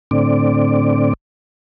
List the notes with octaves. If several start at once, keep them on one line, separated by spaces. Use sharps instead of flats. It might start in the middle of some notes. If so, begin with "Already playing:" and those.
A2 D3 C4 D5